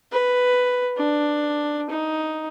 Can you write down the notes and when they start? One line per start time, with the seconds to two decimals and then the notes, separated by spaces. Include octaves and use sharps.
0.12 B4
0.97 D4
1.90 D#4